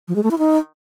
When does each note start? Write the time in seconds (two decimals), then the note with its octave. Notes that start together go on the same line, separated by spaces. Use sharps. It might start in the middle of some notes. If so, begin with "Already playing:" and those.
0.08 F3
0.16 G#3
0.23 A3
0.31 E4
0.38 D#4